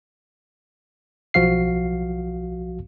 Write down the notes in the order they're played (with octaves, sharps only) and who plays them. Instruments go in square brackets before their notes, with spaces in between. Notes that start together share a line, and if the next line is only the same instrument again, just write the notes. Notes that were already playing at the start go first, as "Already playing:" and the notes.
[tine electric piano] B1 F3 F#4 F5 C7